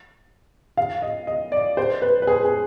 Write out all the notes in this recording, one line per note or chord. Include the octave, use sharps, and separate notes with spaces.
F5
D#5
D#5
D5
C5
B4
B4
G#4
G#4